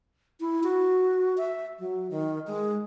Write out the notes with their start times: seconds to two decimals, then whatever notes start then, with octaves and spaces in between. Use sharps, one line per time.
0.40 E4
0.63 F#4
1.38 E5
1.79 F#3
2.10 D#3
2.47 G#3